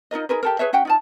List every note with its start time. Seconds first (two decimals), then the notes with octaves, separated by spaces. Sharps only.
0.11 D#4 F4 A#4 D#5
0.29 D#4 G#4 A#4 B4
0.43 G4 A4 A#4
0.59 G#4 B4 C#5 E5
0.73 C#4 F#4 F#5 G5
0.85 D#4 F4 A5